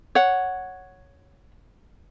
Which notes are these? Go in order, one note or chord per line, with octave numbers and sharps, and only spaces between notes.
C#5 F#5